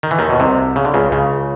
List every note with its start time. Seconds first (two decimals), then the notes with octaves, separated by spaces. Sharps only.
0.03 D#3
0.11 E3
0.19 D#2 D#3
0.30 B2
0.40 C2 C3
0.76 C#3
0.85 D3
0.94 C#2 C#3
1.12 C#2 C#3